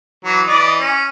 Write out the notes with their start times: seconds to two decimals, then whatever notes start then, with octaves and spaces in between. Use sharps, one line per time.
0.25 E3 F#3
0.47 E3 D5 D#5
0.80 C#4